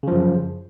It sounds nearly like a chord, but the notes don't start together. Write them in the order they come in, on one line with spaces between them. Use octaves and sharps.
C#3 F3 F#2